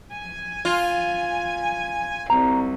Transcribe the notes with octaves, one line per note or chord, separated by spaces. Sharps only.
G#5
F4
C2 A#5